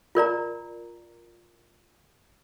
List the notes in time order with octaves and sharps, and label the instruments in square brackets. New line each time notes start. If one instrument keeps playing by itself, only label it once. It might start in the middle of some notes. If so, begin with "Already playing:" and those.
[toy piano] F4 A#4 D5 A#5